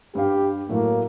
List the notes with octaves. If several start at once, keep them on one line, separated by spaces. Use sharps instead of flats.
G2 G4 F5
A2 F#3 A3 A#3